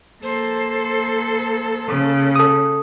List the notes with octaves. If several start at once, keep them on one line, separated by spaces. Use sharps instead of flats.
A#3 A4 C5
C#3
A4 D#6